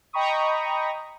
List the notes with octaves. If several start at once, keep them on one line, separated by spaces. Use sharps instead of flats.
D#5 G5 A#5 B5 C#6 D#6